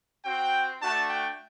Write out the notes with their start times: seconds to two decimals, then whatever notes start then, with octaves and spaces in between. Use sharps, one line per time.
0.24 C4 F#4 G5
0.81 A3 D4 F#4 A5
1.10 G5